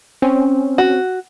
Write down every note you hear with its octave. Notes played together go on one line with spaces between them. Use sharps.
C4 C#4
F#4